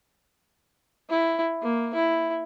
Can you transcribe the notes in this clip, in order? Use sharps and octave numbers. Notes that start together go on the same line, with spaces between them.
E4
A#3
E4